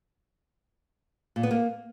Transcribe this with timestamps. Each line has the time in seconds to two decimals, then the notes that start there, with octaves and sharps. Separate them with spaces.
1.36 A#2
1.43 B3
1.51 A#3